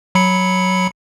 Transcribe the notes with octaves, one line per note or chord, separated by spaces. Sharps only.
F#3 B5 C#7